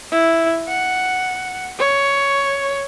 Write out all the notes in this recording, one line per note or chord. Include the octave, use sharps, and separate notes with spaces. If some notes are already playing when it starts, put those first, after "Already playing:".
E4
F#5
C#5